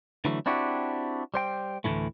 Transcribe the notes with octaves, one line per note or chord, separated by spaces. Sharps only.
D3 E3 F#3 A3
C4 D4 E4 F#4 G4
G3 C5 G5
D2 A2 C3 E3 A3